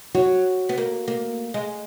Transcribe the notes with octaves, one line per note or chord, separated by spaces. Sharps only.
F#3 F#4
B3
A#3
A#3
G#3